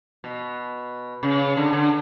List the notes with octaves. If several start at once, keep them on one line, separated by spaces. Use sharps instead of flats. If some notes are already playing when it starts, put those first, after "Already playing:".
B2
C#3
D3
D3